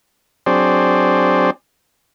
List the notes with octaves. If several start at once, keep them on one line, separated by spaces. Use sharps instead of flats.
F#3 C4 D4 G#4 C5 D5